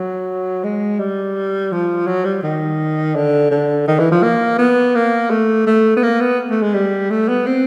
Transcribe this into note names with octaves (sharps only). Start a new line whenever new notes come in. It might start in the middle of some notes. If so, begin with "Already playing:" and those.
Already playing: F#3
G#3
G3
F3
F#3
G3
D#3
D3
D3
D#3
E3
F3
A#3
B3
A#3
A3
A3
B3
A#3
B3
A3
G#3
G3
A3
B3
C4